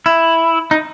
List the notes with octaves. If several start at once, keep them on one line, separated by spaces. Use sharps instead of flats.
E4
D#4